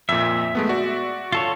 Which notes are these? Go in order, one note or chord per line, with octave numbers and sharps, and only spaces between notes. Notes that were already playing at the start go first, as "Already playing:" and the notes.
F2 A#2 E5
G#3 A3 B3
F#4 D5
F4 A4 C#5